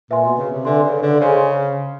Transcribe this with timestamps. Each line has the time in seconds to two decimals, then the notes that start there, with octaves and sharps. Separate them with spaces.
0.10 A#2 B4 E5 G#5 C6
0.24 B2
0.38 C#3
0.51 C3
0.65 D3 B4 E5 G#5 C6
0.84 C#3
1.02 D3
1.20 C#3 G#4 C5 D#5 G#5 C6